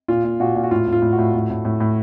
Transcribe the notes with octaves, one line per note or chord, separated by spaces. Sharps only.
A#2 F4
A#2
A#2 F#4
A#2
F#4
A2 F4
A2
F4
A2
F#4
A2
A2
A2
A2
A2